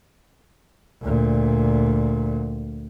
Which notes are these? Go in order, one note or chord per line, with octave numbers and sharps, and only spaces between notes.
D2 A#2